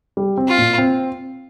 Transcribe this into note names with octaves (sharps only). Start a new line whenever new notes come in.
G3
C4
F4
A#2
C4